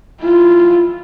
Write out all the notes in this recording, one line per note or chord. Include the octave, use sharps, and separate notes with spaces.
E4 F4